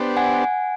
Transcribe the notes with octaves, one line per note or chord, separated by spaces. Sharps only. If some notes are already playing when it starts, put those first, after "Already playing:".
Already playing: B3 D4 G4 C5
F#5 G#5